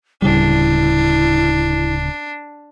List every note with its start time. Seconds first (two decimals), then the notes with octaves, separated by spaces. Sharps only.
0.22 D1 C#3 G3 D4 E4